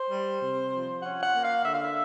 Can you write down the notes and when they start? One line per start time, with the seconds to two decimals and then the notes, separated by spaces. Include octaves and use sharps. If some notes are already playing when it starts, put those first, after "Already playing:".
Already playing: C5
0.10 G3
0.41 C3
0.71 F3
1.02 C#4 F#5
1.23 F#5
1.33 A#3
1.43 F5
1.63 D3 E5
1.74 F5
1.85 E5